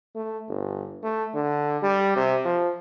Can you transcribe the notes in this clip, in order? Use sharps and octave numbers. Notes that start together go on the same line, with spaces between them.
A3
G1
A3
D3
G3
C3
F3